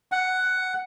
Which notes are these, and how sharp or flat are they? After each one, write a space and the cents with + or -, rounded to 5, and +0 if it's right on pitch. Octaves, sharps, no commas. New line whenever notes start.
F#5 +5